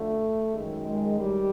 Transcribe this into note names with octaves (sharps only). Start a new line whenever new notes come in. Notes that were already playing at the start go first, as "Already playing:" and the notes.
Already playing: D3 F3 A3
F#2 D#3 G#3
G#3
G3